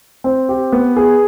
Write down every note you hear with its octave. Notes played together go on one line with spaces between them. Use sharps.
C4
G4
B3
G#4